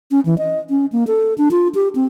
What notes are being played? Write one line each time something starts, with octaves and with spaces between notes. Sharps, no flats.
C#4
E3
D#5
C#4
A#3
A4
D4
F4
G4
C4